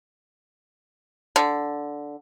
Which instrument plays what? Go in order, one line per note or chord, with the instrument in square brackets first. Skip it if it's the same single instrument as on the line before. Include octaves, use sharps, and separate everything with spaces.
[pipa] D3